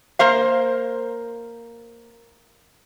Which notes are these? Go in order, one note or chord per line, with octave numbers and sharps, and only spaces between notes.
A#3 A#4 C5 F5